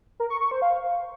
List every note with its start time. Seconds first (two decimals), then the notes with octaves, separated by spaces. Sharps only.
0.20 A#4
0.30 C#6
0.41 C#6
0.51 C5
0.62 F5